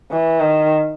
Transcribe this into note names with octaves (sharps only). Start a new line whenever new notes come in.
E3
D#3